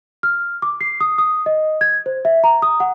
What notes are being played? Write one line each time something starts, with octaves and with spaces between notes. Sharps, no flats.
F6
D6
C7
D#6
D#6
D#5
G#6
C5
E5
A#5
D#6
F#5